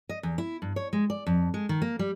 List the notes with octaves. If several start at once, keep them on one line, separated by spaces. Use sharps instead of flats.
D#5
E2
E4
G2
C#5
G#3
D5
F2
G#3
D#3
A#3
G3